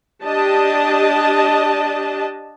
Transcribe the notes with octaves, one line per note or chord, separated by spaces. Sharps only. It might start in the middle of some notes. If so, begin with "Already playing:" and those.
D4 G4 D#5 A5